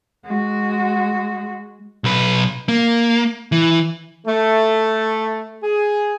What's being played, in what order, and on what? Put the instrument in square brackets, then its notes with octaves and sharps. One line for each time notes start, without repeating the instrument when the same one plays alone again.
[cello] G#3 F#4
[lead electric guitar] B1 B4
A#3
E3
[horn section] A3
G#4